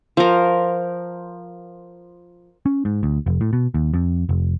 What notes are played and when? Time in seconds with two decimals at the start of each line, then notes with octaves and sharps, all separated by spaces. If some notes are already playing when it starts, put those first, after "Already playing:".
0.17 F3 A#4
2.66 C#4
2.85 G#2
3.03 D2
3.26 F1
3.41 A2
3.53 B2
3.74 D#2
3.94 F2
4.29 F1